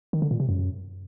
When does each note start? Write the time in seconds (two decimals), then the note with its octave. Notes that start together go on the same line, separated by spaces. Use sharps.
0.13 D#3
0.22 D3
0.31 A#2
0.40 C3
0.49 F#2